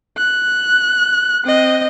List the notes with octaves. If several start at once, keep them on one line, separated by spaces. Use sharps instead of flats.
F#6
C4 D#5